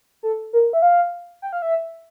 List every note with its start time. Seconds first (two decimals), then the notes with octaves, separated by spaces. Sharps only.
0.23 A4
0.53 A#4
0.73 E5
0.82 F5
1.42 G5
1.53 F5
1.62 E5